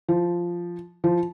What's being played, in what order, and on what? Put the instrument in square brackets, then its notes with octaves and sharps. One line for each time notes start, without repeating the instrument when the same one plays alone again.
[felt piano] F3
F3